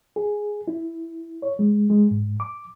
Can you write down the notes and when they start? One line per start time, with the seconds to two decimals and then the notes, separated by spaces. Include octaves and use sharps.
0.16 G#4
0.68 E4
1.42 C#5
1.59 G#3
1.90 G#3
2.11 G#2
2.40 D6